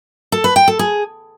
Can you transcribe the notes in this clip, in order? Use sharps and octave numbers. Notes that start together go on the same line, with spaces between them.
A4
B4
G5
A4
G#4